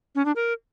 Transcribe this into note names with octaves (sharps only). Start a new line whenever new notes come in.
C#4
D4
A#4